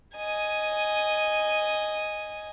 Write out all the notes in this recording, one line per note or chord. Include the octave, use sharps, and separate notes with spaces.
D#5 G#5